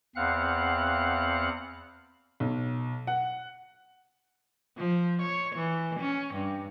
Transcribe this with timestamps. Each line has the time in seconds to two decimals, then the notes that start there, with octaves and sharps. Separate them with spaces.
0.16 E2 C4 F5 F#5 F#6
2.40 B1
3.07 F#5
4.78 F3
5.22 C#5
5.55 E3
6.00 C#4
6.34 G2